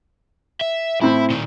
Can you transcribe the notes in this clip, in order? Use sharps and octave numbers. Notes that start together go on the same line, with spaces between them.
E5
A2 C4 E4
A#2 D#3